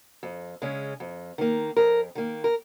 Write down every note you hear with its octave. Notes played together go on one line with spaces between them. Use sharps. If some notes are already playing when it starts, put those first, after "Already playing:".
F2
C#3 G#3 C#4
F2
D#3 A#3
F2 A#4
D#3 A#3
A#4